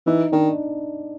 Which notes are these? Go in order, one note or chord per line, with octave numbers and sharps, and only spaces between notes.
E3 D#4
D#3 D4